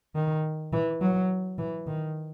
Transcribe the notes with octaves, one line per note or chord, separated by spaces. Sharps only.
D#3
E3
F#3
E3
D#3